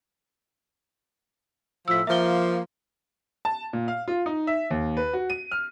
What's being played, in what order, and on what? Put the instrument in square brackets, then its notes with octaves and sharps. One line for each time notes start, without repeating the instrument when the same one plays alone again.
[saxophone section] A2 F3 [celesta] E6 B6
[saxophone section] F3 A#3 [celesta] E5 G7
[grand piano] A5
A#2
F5
F4
D#4
E5
D#2
B4
F#4
D#7
F6